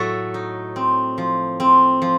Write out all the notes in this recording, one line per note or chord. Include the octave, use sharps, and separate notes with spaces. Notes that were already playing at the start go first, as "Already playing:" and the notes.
Already playing: A2 F#3 A3 F#4 A4
D#4
C4
F3
C4
F3